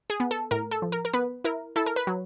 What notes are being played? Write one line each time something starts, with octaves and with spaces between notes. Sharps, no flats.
G#4
B3
A4
A2 A#4
A4
F3
A#4
A#4
B3 B4
E4 A#4
E4 A4
A#4
B4
F#3